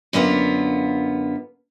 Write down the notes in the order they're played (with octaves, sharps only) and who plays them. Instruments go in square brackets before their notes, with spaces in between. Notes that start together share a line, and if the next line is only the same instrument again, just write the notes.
[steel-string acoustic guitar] F#2 D3 A#3 B3 F4